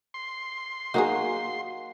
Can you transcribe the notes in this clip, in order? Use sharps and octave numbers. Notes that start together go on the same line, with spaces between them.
C6
F#3 A#3 D#4 F#4 G#4